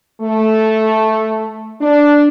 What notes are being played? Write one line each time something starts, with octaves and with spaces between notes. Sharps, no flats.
A3
D4